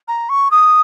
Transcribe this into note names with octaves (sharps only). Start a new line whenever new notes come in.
A#5
C#6
D#6